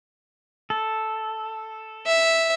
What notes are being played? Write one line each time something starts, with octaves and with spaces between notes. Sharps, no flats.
A4
E5